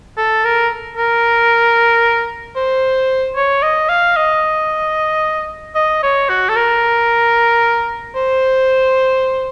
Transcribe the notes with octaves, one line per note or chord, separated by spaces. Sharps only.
A4
A#4
A#4
C5
C#5
D#5
F5
D#5
D#5
C#5
F#4
A4
A#4
C5